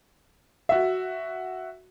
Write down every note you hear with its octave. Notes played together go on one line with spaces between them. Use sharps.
F#4 E5